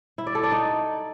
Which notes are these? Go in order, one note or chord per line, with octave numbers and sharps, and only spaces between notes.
E4
D5
A4
D5
D#4